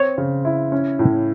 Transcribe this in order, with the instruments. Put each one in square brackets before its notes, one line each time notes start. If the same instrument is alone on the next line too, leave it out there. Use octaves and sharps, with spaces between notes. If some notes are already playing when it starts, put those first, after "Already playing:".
Already playing: [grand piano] C4 [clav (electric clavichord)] C#5
[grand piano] C#3
E4
C#4
A2